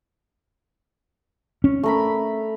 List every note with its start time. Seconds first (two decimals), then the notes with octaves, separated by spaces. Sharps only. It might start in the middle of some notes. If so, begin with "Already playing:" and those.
1.64 C#4
1.83 A3 A#4 B5